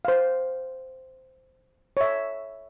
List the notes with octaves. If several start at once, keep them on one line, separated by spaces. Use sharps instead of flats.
C5 F5
C#5 E5